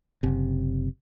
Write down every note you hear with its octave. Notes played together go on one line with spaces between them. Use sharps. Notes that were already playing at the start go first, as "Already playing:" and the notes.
F#1 C3